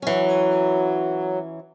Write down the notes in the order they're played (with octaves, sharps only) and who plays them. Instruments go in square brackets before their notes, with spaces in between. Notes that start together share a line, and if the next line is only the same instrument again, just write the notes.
[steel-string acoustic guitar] E3 C#4 [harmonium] F#3